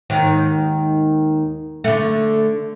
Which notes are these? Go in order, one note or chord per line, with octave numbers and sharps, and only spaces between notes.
D#2 G#2 D#3
D3 A3